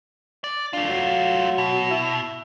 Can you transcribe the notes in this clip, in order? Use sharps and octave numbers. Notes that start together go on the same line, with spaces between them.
D5
A3 D4 F4
F#3
B2
E4